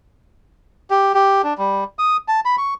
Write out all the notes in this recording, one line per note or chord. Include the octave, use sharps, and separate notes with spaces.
G4
G4
D4
G3
D#6
A5
B5
C#6